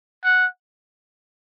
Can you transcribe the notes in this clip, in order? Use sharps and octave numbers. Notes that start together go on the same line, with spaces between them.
F#5